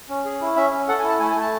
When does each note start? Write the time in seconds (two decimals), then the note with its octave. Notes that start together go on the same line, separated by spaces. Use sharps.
0.09 C#4
0.25 G#4
0.41 E4
0.56 C#4 E5
0.72 C#4
0.88 A4 F#5
0.99 G#5
1.03 E4
1.09 A5
1.19 A3 G#5
1.30 G#5
1.35 A3
1.41 A5